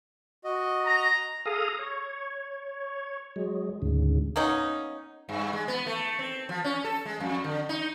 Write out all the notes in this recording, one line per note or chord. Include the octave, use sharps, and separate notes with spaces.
F#4 D#5
A#5
G#4 A4 F5 A#5 D#6
C#5
F#3 G#3
D2 G#2 C#3
A#3 B3 C#4 D#4
G2
G#3
B3
A3
C4
F3
C#4
A4
G#3
F2
D3
D#4